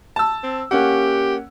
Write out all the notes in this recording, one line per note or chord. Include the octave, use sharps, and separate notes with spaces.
A5 E6
C4
A#3 C#4 G4 F#5